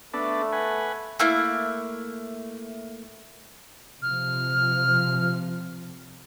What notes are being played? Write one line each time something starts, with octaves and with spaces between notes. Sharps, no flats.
A3 B3 D4 A4
B4 F#5 G#5
A3 A#3 E4
C3 F3 F6